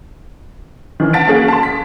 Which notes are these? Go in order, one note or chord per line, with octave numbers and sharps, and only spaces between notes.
D#3 E3 C#4
F5 F#5 A5 A6 B6 D7
A#3 C#4 F#4 G#4
A5 C6
B6